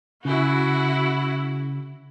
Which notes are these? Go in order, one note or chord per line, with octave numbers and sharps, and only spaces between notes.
C#3 E4 F#4